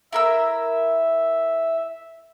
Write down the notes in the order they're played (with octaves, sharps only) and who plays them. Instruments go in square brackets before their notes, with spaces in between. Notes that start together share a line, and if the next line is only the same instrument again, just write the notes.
[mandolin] E4 A#4 E6 [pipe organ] E5